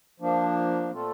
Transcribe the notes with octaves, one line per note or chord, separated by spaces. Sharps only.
F3 A#3 D4
A#2 A3 C4 F4 A4